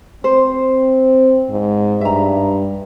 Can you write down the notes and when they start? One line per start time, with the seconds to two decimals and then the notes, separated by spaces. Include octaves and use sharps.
0.24 C4 C5
1.50 G#2
2.01 G2 E5 A#5